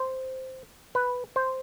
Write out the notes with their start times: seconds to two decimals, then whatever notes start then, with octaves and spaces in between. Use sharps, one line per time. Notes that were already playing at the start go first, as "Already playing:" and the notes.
Already playing: C5
0.95 B4
1.36 C5